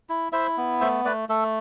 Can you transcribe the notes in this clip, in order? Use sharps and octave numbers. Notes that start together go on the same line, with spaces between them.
E4
E4 C5 E5
B3
A3 C5 E5
A3 B4 D5
A3 A4